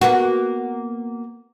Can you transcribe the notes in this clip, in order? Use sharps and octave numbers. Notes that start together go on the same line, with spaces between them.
A#3 B3 F#4